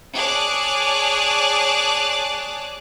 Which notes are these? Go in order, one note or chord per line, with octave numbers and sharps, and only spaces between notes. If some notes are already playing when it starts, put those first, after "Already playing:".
G#4 C#5 D5 A5 D6 F#6